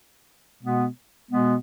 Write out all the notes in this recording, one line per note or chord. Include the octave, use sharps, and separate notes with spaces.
B2 G#3 B3
B2 G#3 B3